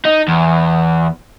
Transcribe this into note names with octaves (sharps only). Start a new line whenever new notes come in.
D#4
E2